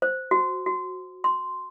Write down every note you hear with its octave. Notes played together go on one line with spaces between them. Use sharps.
C5
F#4
F#4
C6